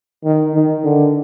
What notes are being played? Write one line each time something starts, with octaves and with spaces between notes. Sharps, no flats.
D#3
D#3
D3